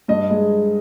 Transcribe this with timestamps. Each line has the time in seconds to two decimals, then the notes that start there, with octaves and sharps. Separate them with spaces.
0.08 G2 D#5
0.30 G#3